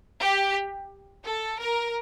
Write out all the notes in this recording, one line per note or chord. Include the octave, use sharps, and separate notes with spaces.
G4
A4
A#4